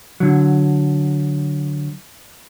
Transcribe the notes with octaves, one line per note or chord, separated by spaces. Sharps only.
D3 F#3